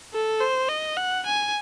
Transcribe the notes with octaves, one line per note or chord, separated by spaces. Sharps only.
A4
C5
D#5
F#5
G#5